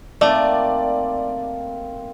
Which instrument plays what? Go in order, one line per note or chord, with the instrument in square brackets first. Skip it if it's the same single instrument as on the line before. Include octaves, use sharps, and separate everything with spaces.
[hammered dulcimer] D#3 A#3 C4 [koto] A3 [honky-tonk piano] D5